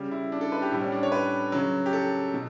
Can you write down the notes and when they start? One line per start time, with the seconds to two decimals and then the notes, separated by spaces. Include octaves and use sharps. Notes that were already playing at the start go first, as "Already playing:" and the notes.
Already playing: C#3 G3
0.12 E4
0.32 D4
0.41 A4
0.52 B4
0.62 G4
0.71 A2 G3
0.81 C#4
0.92 D4
1.03 C#5
1.12 B4
1.52 C#3 F#3
1.86 G4
1.93 A4
2.34 B2